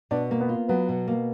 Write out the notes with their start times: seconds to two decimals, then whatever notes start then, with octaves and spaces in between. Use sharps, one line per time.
0.11 B2 D4 D5
0.31 A#3
0.39 B3 B4
0.49 F4
0.68 F#3 B3 B4
0.89 B2
1.08 A#3